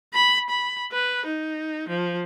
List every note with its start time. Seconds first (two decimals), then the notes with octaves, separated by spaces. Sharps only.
0.14 B5
0.50 B5
0.92 B4
1.26 D#4
1.88 F3